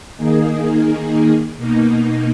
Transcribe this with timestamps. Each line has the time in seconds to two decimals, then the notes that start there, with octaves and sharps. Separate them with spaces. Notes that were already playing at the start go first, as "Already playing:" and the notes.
0.17 D#3 A#3 D#4 G#4
1.57 B2 A#3 D#4